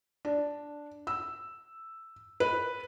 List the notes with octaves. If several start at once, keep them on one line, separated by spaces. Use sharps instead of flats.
D4
E6
B4